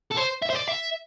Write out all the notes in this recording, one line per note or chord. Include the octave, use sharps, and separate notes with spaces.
A4
C5
E5
C5
D5
E5